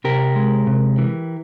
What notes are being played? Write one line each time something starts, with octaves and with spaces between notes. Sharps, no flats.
C3 G4 A#4
G#3
C3
E3